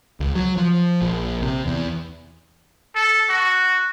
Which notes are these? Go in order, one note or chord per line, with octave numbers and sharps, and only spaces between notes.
C#2
F#3
F3
A#1
C3
E2
A4
F#4